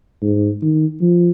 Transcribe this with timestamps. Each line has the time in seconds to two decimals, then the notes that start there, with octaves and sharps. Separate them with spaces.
0.22 G#2
0.62 D#3
1.01 F3